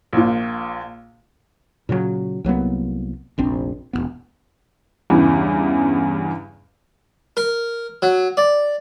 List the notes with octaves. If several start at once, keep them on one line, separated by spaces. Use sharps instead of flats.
A#1 A#2
A#2 C#3 F3 F#3
C2 F#3 A#3 B3
F1 A#1 C4 D4
E1 F2 B3
E2 G2 C#3 E3
A#4
F#3
D5